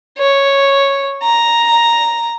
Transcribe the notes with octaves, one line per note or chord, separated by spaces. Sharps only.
C#5
A#5